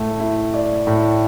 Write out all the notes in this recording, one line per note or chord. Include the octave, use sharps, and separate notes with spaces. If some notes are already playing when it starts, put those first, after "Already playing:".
Already playing: A2 A3
E4
D5
A2